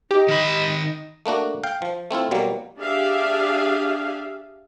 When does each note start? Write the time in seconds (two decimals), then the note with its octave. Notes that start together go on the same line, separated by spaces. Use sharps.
0.11 D#4 G4
0.28 D#3 B5
1.26 A3 A#3 D4 F#4
1.64 F5 G5
1.82 F3
2.11 A3 C4 E4 F4
2.31 B2 F#3 G3 A#3
2.80 D4 G4 G#4 E5 F5